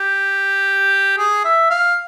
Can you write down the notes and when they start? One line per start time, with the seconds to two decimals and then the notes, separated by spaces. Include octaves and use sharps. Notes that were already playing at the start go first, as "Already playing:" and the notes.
Already playing: G4
1.18 G#4
1.45 E5
1.70 F5